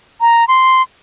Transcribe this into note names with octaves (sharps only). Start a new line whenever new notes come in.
A#5
C6